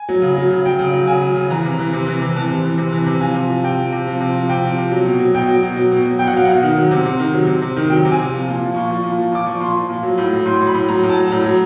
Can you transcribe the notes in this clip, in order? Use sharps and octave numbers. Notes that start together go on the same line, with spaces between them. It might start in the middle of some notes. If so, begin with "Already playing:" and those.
Already playing: G#5
F#3
C#3
F#3
C#3
F#3 G5
C#3
F#3
C#3 G#5
F#3
C#3
E3 A#5
C3
E3
C3
E3
C3
E3 A5
C3
E3
C3
E3
C3
F3 G#5
C3
F3
C3 G5
F3
C3
F3
C3
F3
C3 G5
F3
C3
F#3
B2
F#3
B2 G5
F#3
B2
F#3
B2
F#3
B2 G5
F#5
F#3 F5
B2 F#5
D#3
F#3
C3
C3
D#3
F#3
C3
C3
D#3
F#3 G5
C3
G#5
C3
F3
A#2
F3
A#2 C#6
F3
A#2
F3
A#2 D6
F3 C#6
A#2 C6
F3
A#2
F#3
A2
F#3
A2 C6
F#3
B5
A2
F#3 A#5
A2
A5
F#3
A2 A#5
F#3